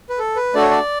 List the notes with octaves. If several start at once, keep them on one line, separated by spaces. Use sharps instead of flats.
B4
A4
B4
A3 D4 F#4 A4 D5
C#5
D5